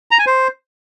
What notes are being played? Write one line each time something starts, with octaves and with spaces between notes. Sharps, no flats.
A#5
G#5
C5